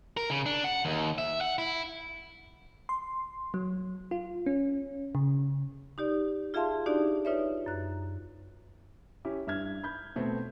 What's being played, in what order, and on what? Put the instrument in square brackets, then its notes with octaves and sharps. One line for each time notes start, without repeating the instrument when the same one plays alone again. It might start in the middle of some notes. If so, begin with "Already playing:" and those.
[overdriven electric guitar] A#4
C#3
D4
F#5
D#2
E5
F#5
E4
[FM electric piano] C6
F#3
F4
C#4
C#3
[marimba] D#4 G4 D5
F4 G#4 E5 F5 A5 C6
D4 D#4 F#4 G4 D5
D#4 F4 B4 C#5 D5 E5
F#2 F#6
[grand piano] C#4 E4 G4
G2 E5 F6 G#6
B5 G6 G#6
B2 A3 B3 C4